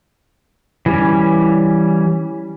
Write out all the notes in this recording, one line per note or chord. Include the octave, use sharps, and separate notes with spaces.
E3 G3 C#4